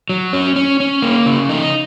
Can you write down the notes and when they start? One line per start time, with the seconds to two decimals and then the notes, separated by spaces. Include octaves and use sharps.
0.10 F#3
0.33 C#4
0.56 C#4
0.80 C#4
1.02 A#3
1.26 C#3
1.49 D#4